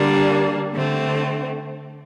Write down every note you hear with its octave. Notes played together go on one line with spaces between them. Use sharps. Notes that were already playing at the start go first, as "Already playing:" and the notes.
Already playing: D3 G3 A#3 D4
D3 A3 C4